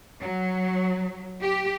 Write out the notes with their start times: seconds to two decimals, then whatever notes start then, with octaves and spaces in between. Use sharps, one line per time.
0.22 F#3
1.41 G4